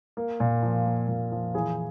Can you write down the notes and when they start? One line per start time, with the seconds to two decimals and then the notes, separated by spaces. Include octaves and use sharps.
0.17 A#3
0.40 A#2
0.63 F3
0.86 A#3
1.08 A#2
1.32 F3
1.54 E3 G#4